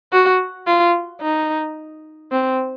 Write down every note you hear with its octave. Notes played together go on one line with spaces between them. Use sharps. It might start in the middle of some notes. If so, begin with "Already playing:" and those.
F#4
F4
D#4
C4